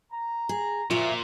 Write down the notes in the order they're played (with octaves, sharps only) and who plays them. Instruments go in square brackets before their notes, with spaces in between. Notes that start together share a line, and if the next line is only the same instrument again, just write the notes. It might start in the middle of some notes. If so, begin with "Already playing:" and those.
[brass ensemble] A#5
[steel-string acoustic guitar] G#4
[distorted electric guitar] A#2 [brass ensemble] F3 F#4 [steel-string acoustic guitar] F4 E5